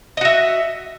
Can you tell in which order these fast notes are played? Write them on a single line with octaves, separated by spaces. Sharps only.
D#5 F#4 E5